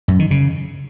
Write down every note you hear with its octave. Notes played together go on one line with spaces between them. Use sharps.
F#2
D#3
C#3